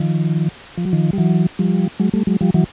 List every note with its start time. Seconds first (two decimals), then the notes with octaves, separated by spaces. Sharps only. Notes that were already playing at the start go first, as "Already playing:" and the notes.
Already playing: D#3 F3
0.77 F3
0.85 F#3
0.93 D#3 F3
1.13 G3
1.18 E3 F#3
1.59 F3 G3
2.00 F#3 G#3
2.13 G3 A3
2.27 F#3 G#3
2.41 F3 G3
2.54 E3 F#3